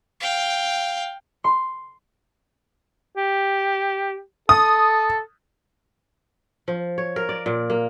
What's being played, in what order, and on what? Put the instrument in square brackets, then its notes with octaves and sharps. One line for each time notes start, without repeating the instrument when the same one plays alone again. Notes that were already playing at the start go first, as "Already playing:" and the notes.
[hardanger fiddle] F5 G5
[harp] C6
[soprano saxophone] G4
[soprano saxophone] A4 [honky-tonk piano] D#6
[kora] F3
C#5
A#4
D5
A#2
A#3